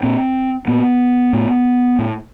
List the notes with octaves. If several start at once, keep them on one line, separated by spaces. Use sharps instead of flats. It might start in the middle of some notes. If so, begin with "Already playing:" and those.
A#2 C4
A#2 B3
A2
A2